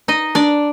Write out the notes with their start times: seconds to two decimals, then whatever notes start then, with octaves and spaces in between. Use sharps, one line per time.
0.08 D#4 D#5
0.35 D4 D5